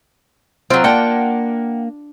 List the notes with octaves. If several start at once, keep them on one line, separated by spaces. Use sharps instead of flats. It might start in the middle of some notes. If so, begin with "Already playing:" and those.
F#3 C4 F4
A#3 D4 F#5 G5